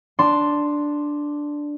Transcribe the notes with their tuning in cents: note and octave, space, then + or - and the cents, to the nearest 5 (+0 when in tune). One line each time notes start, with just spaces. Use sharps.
D4 +0 A5 +0 C6 +0